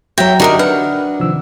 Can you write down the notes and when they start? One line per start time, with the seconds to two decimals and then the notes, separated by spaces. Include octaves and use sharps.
0.18 F#3 F#4 C#5 E5 G5 A#5 A#6
0.40 D3 D4 D#4 F#4 G4 A4 A#4 D#5
0.59 B4 F#5 F6
1.20 C3 D#3 F3 E6